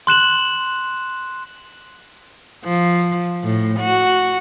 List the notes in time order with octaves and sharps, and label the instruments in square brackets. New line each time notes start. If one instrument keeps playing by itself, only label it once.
[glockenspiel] C6 F#6 E7 F#7
[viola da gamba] F3
A2
F#4